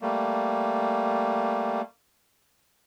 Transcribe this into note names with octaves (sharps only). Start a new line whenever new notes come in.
G3 A3 A#3